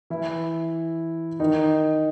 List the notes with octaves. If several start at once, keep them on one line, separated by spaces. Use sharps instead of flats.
E3 E4
D#3 D#4